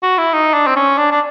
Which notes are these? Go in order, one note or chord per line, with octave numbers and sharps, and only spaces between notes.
F#4
E4
D#4
D4
C4
C#4
D4
D4